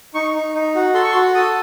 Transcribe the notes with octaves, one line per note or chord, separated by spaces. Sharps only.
D#4 C#6
D#4
D#4
F#4
A4 C6
C#6
C6
F#4
A4 D#6